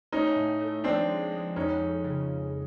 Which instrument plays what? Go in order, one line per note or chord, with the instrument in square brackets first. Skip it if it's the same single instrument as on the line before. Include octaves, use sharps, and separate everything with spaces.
[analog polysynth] A3 [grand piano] C#4 D#4
[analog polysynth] A2
A3
[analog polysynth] F3 [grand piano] C4 D4
[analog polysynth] G#3
G#3
[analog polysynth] F2 [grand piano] C#4 D#4
[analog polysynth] F2
C#3